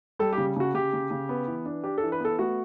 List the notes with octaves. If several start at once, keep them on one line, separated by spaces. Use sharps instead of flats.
G3 A4
G4
C#3
C#3 F#4
C#3 G4
C#3
C#3
B3
E3
D4
D4 G4
A4
E3
B4
B3 A4
A3 F#4